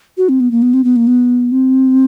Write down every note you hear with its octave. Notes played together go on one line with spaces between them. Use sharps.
F#4
C4
B3
A#3
B3
C4
B3
A#3
B3
C4